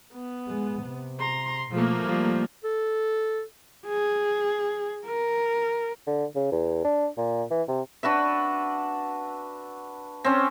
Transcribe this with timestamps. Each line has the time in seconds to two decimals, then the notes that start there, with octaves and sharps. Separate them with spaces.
0.14 B3
0.48 G#3
0.83 C3
1.19 A#5 C6
1.72 B2 F3 A3 A#3
2.06 F3 G3
2.64 A4
3.86 G#4
5.06 A#4
6.07 D3
6.35 C#3
6.52 E2
6.84 D4
7.17 A#2
7.51 E3
7.68 C3
8.03 D4 F#4 B4 E5
10.24 C4 C#4